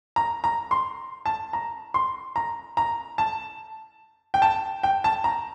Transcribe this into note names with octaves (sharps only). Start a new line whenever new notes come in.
A#5
A#5
C6
A5
A#5
C6
A#5
A#5
A5
G5
A5
G5
A5
A#5